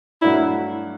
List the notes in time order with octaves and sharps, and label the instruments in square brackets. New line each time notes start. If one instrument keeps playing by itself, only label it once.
[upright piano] G2 F#3 A3 D4 F#4 [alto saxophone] E4